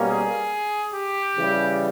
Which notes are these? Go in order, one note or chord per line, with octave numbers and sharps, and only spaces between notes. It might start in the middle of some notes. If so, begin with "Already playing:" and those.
Already playing: B2 G3 A#3 C#4
G#4
G4
C#3 E3 G3